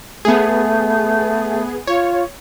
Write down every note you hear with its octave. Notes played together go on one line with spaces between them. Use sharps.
A3 B3 G#4
F4 C#5